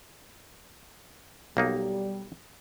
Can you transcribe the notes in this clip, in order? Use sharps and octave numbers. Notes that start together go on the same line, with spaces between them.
B1 G3 A#3 D#4